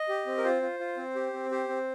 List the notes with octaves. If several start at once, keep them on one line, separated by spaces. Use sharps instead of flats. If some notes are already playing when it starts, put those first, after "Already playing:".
Already playing: D#5
G4
C4
A#4
F4 C5
F4
F4
C4
G4
C4
G4 C5
C4